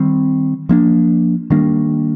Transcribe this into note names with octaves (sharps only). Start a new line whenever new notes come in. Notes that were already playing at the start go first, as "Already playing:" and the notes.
Already playing: D#3 G3 C4
F3 A#3 D4
D#3 G3 A#3 D4